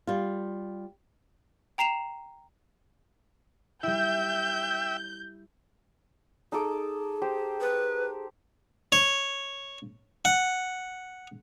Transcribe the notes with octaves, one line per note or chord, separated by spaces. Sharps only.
G3 F4
G5 A#5 C7 E7 F7
G3 E4 E5 G5 G6
D#4 G#4 A4 D6
G4 C5
B4
C#5
F#5